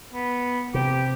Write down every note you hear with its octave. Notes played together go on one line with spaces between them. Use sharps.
B3
C3 G4